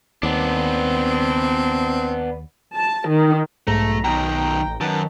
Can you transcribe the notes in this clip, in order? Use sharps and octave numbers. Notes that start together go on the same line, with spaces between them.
D#2 B3 C4 D4
A5
D#3
B1 G#2 A3 A#5
B1 B2 D#3 G5 A#5
A1
F#2 D#3 B3 A5